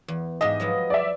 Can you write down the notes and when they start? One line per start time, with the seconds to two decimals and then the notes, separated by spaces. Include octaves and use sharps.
0.08 E2
0.41 G#2 G4 D#5 E5
0.60 F3 F#3 B3
0.90 D5 E5